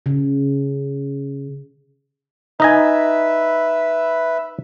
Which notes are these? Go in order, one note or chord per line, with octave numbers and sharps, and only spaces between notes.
C#3
D#4 B4 D#5 E5 G#5